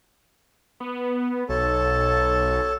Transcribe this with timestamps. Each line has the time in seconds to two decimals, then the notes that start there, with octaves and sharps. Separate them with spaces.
0.80 B3
1.49 B1 A4 C#5 A5